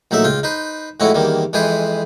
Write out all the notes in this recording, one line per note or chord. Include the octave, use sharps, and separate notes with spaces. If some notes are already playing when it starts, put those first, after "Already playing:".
A#1 F#3 A3 D#4 E5
C#2 F4 G5
D#4 B4 C5
F2 A2 G#3 E4 F#4 C#5
E2 D#3 G3 A#3
F2 E3 G#3 G#4 B4 C5